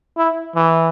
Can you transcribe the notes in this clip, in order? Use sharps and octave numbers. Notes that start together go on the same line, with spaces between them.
E4
E3